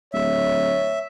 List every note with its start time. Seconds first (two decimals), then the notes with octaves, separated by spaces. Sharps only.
0.13 D1 C#5 E5